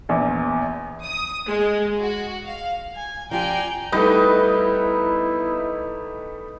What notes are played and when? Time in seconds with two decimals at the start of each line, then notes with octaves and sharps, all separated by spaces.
0.09 A#1 E2
1.04 D#6
1.48 G#3
2.00 F#4
2.45 F5
2.96 G#5
3.31 F3 F4 G4 D5 G5 G#5 A#5
3.92 G3 A3 B3 D#4 E4 B4 D#5